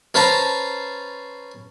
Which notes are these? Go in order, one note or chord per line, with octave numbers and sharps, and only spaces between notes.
C#4 B4 C5 A5 A#5